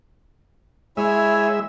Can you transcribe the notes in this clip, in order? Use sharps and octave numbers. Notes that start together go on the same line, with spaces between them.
G#3 E4 C#5 E5 G#5